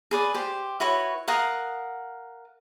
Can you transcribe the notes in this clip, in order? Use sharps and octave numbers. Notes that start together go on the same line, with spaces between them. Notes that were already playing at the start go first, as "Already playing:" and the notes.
G#4 B4 D5
G4 C5
E4 F#4 B4 C#5
A#4 F5 F#5 D#6